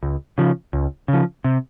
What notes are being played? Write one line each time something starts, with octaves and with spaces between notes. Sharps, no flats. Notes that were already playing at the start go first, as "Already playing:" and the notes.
C#2
C#3 F3
C#2
C#3
F3
C3